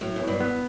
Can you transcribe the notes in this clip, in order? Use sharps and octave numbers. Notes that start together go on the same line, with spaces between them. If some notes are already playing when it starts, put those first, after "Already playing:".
A2 F#3
F#2
B3
G2
B3